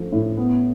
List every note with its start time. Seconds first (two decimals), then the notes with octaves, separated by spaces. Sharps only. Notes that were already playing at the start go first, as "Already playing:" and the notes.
Already playing: F3 A3
0.12 A2
0.37 B3